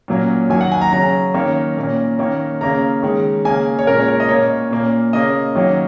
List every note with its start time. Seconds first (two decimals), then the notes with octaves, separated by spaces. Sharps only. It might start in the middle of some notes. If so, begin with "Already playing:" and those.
0.08 A#2 F#3 A#3 C#4
0.50 D#3 F#3 A#3 G#5
0.61 F#5
0.72 G#5
0.81 A#5
0.92 C#3 F#3 C#4 A#5
1.34 D#3 A#3 C#4
1.77 A#2 A#3 C#4
2.19 D#3 A#3 C#4
2.61 C#3 A#3 C#4 A#5
3.03 D#3 G#3 C#4
3.45 C#3 A#3 C#4 G#5
3.79 C#5
3.87 A#2 G#3 C#4 A#4
4.00 C#5
4.08 A#4
4.20 D#5
4.29 A#2 A#3 C#4 C#5
4.71 A#2 A#3 C#4
5.13 C#3 A#3 C#4 D#5
5.55 D#3 F#3 A#3 C#4